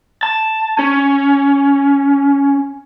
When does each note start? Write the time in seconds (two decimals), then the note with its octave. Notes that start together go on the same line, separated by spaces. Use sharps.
0.23 A5
0.79 C#4